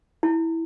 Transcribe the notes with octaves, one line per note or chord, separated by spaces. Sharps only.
E4